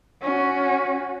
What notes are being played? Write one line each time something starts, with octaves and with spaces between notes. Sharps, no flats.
C#4 F#4